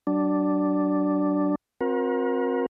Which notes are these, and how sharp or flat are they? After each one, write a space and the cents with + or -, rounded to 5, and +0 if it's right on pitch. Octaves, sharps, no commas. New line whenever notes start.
F#3 +40 D4 +0
C4 +20 F#4 -35 A#4 +35